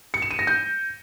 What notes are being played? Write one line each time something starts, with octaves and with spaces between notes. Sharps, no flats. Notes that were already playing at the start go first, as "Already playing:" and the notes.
C#7
E7
D#7
A#6
G6